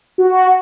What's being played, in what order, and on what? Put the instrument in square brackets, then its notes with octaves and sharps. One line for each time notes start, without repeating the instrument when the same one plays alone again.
[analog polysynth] F#4